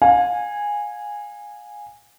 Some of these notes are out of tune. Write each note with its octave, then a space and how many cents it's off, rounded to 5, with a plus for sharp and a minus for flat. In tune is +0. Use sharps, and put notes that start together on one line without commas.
F5 +35 G#5 -10